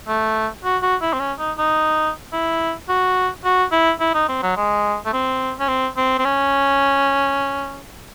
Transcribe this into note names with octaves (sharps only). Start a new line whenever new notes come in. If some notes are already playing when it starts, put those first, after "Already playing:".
A3
F#4
F#4
E4
C4
C#4
D#4
D#4
E4
F#4
F#4
E4
E4
D#4
C4
F#3
G#3
A3
C4
C#4
C4
C4
C4
C#4